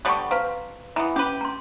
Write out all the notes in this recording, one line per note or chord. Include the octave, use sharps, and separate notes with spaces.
D3 G3 B3 B5 C#6
C4 B4 F5 A#5
E3 B3 A#5
C#4 G4 B4
A#5 C6